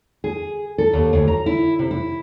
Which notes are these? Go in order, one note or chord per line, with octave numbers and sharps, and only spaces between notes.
G#4
A4
D#2
D2
A#5
E4
C3
E4